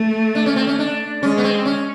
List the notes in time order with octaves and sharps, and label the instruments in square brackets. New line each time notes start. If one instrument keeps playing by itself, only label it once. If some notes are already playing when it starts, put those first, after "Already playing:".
Already playing: [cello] A3
[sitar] D4
C#4
C4
C#4
D4
[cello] G#3 [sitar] C#4
[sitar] B3
C4
C#4